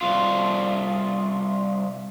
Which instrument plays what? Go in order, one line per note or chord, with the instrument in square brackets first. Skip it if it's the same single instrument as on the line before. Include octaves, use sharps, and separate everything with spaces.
[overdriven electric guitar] C2 F4